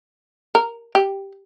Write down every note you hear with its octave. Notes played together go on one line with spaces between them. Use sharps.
A#4
G4